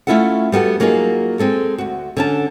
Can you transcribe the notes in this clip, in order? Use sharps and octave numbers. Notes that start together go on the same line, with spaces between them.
A3 C#4 E4 F4 A4 F#5
G3 B3 F#4 A4
F#3 A#3 D#4 F4 G#4
G#3 C4 A4
D2 F#4
D3 C#4 A5